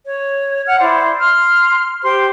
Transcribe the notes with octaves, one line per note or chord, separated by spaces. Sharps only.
C#5
F#5 F6
E4 C5 D5
C6 F6
G4 C5 C6